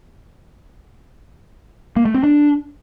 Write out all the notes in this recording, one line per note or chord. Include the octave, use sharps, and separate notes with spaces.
A#3
A3
C4
D4